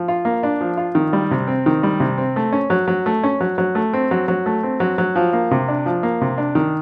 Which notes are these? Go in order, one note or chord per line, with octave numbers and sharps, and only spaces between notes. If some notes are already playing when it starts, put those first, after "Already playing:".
Already playing: F3
F4
A#3
D4
F3
F4
D#3
G3
C3
C4
D#3
G3
C3
C4
A3
C#4
F#3
F#3
A3
C#4
F#3
F#3
A3
C4
F#3
F#3
A3
C4
F#3
F#3
F3
A#3
C3
D4
F3
A#3
C3
D4
D#3